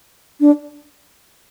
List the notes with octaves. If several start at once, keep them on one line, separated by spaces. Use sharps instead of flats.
D4